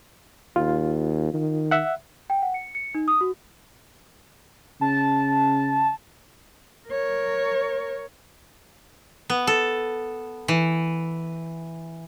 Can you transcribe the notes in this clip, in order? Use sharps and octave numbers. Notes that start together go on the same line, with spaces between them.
D#2 F4
D#3
E5 F#5
G5
F#5
C#7
C#7
D#4
D#6
F#4
C#3 A5
A#4 C#5
B3
A4
E3